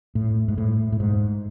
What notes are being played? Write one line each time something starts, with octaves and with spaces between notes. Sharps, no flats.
A2
G#2
A2
A2
G#2